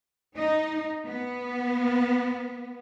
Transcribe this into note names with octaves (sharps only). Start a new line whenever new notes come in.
D#4
B3